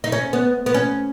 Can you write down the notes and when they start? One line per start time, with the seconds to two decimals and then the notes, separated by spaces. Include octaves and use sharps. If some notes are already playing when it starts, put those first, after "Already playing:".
0.04 D#4
0.12 C#4
0.33 B3
0.66 B3
0.74 C#4